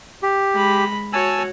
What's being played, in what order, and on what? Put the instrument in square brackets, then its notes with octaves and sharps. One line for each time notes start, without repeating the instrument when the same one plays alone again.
[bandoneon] G4
[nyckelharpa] G#3 B5
[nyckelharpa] F#4 C#5 [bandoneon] G#5 A5 E6